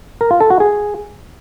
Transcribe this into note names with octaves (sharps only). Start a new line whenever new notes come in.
A#4
F4
A4
F#4
G#4